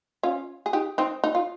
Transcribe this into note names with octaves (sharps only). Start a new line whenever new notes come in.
C#4 F4
G#4
D#4 G4
C4 D#4
D#4
F4